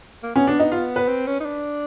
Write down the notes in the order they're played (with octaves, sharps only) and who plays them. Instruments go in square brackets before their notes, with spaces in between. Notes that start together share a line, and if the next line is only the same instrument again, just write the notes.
[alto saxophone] A#3
[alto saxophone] B3 [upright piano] C#4
[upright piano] D4
D#4
F4
B4
[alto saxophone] C4
C#4
D#4
D4